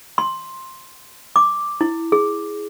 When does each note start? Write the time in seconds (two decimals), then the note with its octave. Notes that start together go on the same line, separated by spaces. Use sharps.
0.18 C6
1.36 D6
1.81 E4
2.12 G#4